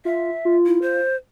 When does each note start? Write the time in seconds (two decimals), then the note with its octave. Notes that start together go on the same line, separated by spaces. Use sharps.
0.05 F4 E5
0.45 F4
0.66 E4
0.82 C5